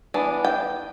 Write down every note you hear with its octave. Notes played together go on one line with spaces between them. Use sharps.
E3 B3 D4
G5